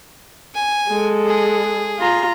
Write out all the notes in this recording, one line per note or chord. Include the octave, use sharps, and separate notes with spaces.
G#5
G#3 A4
G#4
F4 A#5